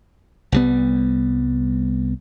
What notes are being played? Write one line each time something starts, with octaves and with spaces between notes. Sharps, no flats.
C2 G3 B3